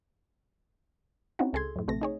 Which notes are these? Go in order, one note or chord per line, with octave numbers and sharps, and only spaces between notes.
C4 C#4 D#4 E4 F#4
C#2 G#4 A4 C6 G#6
F#2 A2
A#1 C3 A3 C4 A#6
D#4 G#4 C#5